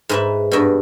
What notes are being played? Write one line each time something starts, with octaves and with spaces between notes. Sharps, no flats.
G#2 B4 E5
G2 B2